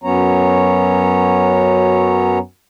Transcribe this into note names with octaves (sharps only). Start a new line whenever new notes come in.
F#2 F#3 B3 C#4 C#5 A#5